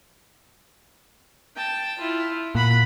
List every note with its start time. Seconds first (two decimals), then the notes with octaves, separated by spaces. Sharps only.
1.56 G5 A5
1.99 E4 F4
2.55 A#2 F#5 B5